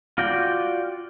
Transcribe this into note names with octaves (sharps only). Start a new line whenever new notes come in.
F4 F#4 D5 G5